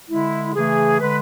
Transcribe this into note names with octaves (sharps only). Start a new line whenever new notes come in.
D3 G#3 E4
C#3 E3 A3 G#4
D3 G#3 B4